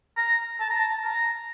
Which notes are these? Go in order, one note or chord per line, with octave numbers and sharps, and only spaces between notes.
A#5
A5
A#5
A5
A#5